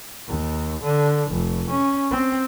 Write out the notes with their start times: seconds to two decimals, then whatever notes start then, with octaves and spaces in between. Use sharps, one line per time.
0.28 D#2
0.83 D3
1.32 F1
1.71 C#4
2.11 C4